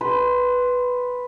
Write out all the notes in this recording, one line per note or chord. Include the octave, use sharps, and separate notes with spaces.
B4 C6